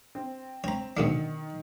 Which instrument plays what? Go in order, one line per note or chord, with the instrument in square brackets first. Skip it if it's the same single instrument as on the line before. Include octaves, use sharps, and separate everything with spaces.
[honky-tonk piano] C4
[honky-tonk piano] C4 [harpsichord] C#5 A#5
[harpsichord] B1 D3 D4 [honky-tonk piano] D#3 C#7